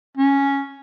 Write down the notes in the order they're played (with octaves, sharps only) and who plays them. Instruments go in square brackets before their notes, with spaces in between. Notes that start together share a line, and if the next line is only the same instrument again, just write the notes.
[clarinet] C#4